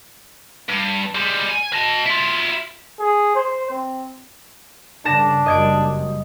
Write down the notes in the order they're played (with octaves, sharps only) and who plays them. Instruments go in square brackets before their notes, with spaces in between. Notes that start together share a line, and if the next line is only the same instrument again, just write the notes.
[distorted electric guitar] G2
G3 G#3
G#5
D#5 A5
E4 F4
[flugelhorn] G#4
C5
C4
[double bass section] G2 C#3 [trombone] D4 [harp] A5 A#6 E7
[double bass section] F#1 F#2 G3 [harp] D#5 G#6 D7